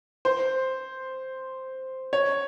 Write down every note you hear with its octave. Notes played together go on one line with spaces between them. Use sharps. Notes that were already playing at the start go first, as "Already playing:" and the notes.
C5
C#5